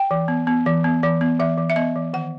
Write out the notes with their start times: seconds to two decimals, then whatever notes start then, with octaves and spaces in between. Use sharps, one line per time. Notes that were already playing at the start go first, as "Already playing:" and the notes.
Already playing: G5
0.11 E3
0.28 B3
0.47 B3
0.66 E3
0.84 B3
1.03 E3
1.21 B3
1.40 E3 E5
1.57 E3
1.70 E5
1.76 B3 D#5
1.96 E3
2.13 D#3 F#5